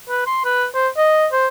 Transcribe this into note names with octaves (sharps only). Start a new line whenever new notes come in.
B4
C6
B4
C5
D#5
C5